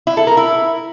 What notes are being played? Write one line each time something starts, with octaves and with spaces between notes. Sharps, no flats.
E4
A4
A#4
E4